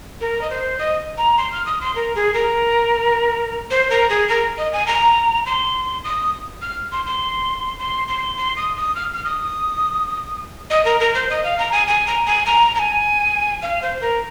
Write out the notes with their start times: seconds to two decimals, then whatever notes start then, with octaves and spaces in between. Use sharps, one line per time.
0.21 A#4
0.41 D#5
0.50 C5
0.79 D#5
1.18 A#5
1.38 C6
1.52 F6
1.66 D#6
1.81 C6
1.96 A#4
2.15 G#4
2.34 A#4
3.71 C5
3.90 A#4
4.09 G#4
4.29 A#4
4.58 D#5
4.73 G#5
4.87 A#5
5.46 C6
6.04 D#6
6.62 F6
6.92 C6
7.06 C6
7.79 C6
8.08 C6
8.37 C6
8.56 D#6
8.76 D#6
8.95 F6
9.14 F6
9.24 D#6
10.70 D#5
10.85 A#4
11.00 A#4
11.14 C5
11.30 D#5
11.44 F5
11.59 A#5
11.72 G#5
11.87 G#5
12.07 A#5
12.26 G#5
12.46 A#5
12.75 A#5
12.79 G#5
13.62 F5
13.82 C5
14.01 A#4